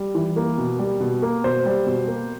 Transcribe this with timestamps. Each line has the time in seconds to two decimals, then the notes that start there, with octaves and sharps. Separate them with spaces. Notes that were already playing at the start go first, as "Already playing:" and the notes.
Already playing: G3
0.15 E3
0.36 A#3
0.58 B2
0.79 G3
1.00 B2
1.22 A#3
1.44 B2 C5
1.66 G3
1.87 B2
2.08 A#3